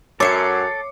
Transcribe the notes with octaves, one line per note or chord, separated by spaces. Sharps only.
F#2 A4 C#5 E5 D6 C7 C#7